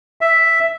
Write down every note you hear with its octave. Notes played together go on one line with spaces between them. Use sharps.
E5